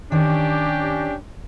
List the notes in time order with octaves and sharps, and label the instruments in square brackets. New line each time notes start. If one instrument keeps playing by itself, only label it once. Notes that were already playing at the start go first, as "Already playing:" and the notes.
[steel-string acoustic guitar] D#3 C#5 [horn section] C#4 D4 G4